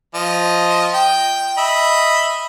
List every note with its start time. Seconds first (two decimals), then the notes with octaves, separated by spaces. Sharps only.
0.15 F3 D#5
0.94 G5
1.57 D#5 E5 B5